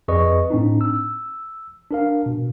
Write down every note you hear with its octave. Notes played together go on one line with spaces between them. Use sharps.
F2 G#4 B4 D5 D#5 C#6
A2 C4 D4 D#4
E6
D4 A#4 F5
B2